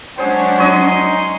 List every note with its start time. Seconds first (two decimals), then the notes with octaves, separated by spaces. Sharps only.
0.18 F#3 G#3 C#4 D4 C5 C#5 F#5
0.58 D#4 C#5 D#5 G#5 C6